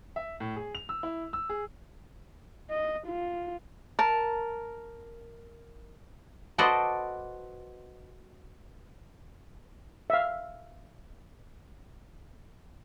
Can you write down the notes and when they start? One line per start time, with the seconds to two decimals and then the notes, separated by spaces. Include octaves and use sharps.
0.16 E5
0.40 A2
0.56 G#4
0.75 F7
0.89 E6
1.03 E4
1.33 E6
1.49 G#4
2.70 D#5
3.07 F4
3.99 A#4 A5
6.58 F#4 A4 B4 C5 D5 D#5
10.10 E5 F5